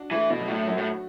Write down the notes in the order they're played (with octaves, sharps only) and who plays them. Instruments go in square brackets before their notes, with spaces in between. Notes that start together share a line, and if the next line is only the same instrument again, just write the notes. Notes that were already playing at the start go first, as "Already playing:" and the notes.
Already playing: [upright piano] D4 F#4
[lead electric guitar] E3 [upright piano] A3
[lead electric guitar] B2
[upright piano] F#3
[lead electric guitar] A2
[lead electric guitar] F#2 [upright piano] F#4
[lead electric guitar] A2